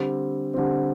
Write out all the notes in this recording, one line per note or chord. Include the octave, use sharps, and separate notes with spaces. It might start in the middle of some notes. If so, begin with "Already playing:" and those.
Already playing: D3 G3 C4
D3 G3 C4